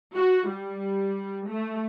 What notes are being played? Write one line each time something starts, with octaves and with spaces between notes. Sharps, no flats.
F#4
G3
A3